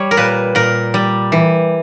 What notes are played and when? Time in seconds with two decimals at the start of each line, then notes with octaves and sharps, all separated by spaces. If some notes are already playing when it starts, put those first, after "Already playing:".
Already playing: G3 C#5
0.11 A#4
0.17 A#2 B4
0.55 A#2 A#4
0.94 G3
1.32 E3